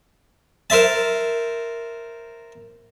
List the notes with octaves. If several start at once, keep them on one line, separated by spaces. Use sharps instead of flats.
A#4 C5 E5 A5